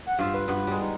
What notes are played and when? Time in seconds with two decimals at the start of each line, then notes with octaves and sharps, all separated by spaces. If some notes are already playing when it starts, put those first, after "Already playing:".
0.06 F#5
0.19 G2 F4 E5 F5
0.34 B4
0.48 G2 B3
0.67 G3 G#3
0.82 D#4